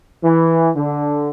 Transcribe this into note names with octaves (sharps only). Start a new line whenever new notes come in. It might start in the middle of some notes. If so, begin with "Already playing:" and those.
E3
D3